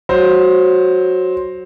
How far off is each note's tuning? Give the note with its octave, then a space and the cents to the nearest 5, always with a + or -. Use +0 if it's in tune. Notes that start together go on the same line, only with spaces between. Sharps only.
F#3 +0 C5 +5